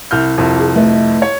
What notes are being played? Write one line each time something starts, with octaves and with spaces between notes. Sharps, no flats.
C2 F6 G6
C2 F2
G#4
A3 B4 D#5
C#5